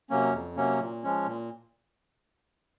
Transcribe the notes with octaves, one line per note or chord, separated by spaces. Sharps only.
C3 F#3 A#3 C#4
F2
C3 F#3 A#3 C#4
A#2
F3 G#3 C#4
A#2